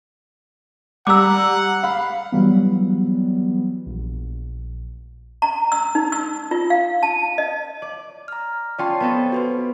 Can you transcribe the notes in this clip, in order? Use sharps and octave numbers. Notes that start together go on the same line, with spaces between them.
G3 F#5 A#5 D6 E6
F5 B5
E3 F#3 G3 B3
A#1
A#5
E6
D#4
E6
F4
F5
A5
D#5
D5
A#5 F6
C#4 F4 D5 G5 A5 C6
B3 C4 A4
F#4 B4 C5